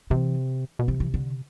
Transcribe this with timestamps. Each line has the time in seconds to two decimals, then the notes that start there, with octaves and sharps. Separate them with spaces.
0.10 C3 E3
0.79 B2
0.88 C3 E3
1.00 E3
1.14 D3